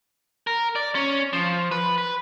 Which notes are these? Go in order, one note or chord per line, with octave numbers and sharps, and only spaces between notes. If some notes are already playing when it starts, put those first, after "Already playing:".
A#4
D5
C#4
F3
B4
B4